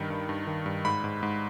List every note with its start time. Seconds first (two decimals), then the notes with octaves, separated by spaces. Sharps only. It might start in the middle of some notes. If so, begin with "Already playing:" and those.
Already playing: G2 D#3 B5
0.10 G2
0.29 G2
0.47 D#3
0.66 G2
0.85 G#2 B5
1.04 G#2
1.23 G#2